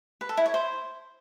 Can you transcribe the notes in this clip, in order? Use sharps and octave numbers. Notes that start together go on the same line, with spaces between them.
B4
A4
E4
C#5
C5